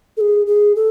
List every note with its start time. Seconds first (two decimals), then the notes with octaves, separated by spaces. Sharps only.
0.17 A4
0.21 G#4
0.47 G#4
0.76 A4